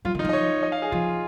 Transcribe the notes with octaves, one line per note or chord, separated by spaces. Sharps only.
F#3 F4
D#3
D#4
F3 D#5
C#5
D#5
F5
G#4
F3 F4